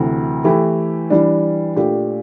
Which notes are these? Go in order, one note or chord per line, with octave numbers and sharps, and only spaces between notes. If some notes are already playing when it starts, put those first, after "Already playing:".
Already playing: D2 C3 E3
E3 A3 E4 G4
E3 G3 D4
A#2 A3 D4 G4